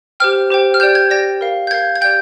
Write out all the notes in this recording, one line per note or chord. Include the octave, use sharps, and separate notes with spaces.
G4 C5 G5 F6
G4 C5 G5
F6
G4 D5 G5 G6
G#6
G4 D5 G5 A#6
A#4 F5
G6
A#4 F5 G#6
G#6
G4 D5 G5 G6